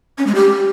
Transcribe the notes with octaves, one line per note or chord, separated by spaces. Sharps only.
C#4
G#3
G4